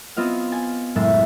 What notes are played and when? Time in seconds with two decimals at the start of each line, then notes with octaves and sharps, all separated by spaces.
0.17 B3 C4 F4 D#5 F5
0.52 G#5 A6
0.95 F#1 A2 G#3 E5 A6